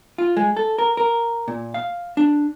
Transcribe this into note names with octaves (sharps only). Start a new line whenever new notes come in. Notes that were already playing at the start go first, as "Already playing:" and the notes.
F4
G#3
A4
A#4
A#4
A#2
F5
D4